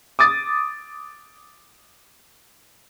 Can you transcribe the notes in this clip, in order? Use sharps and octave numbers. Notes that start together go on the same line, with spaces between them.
D6 D#6 A6